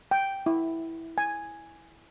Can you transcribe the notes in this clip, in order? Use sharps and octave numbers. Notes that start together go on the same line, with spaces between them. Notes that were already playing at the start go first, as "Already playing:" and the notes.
G5
E4
G#5